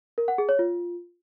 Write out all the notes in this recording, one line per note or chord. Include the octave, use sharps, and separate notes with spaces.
A#4
F#5
G#4
C#5
F4